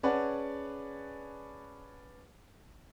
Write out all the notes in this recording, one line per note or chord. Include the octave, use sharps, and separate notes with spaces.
C#4 G#4 B4 D5 F#5 A5